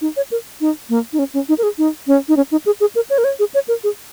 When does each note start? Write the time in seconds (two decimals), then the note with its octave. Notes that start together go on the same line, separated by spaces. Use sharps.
0.01 D#4
0.17 C#5
0.32 A#4
0.61 D#4
0.89 A#3
1.13 D#4
1.19 C#4
1.34 C#4
1.49 D#4
1.58 A#4
1.63 G#4
1.78 D#4
2.07 C#4
2.29 D#4
2.37 C#4
2.52 D#4
2.66 G#4
2.80 G#4
2.95 A#4
3.10 C#5
3.18 A#4
3.24 C#5
3.39 G#4
3.54 C#5
3.68 A#4
3.84 G#4